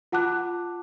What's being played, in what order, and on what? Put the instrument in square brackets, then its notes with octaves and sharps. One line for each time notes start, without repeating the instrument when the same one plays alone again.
[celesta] F4 F#5 A5 D6 F#6